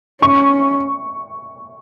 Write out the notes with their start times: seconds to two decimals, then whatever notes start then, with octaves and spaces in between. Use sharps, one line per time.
0.22 C#4 C#6